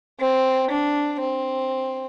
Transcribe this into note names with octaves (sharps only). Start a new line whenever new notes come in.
C4
D4
C4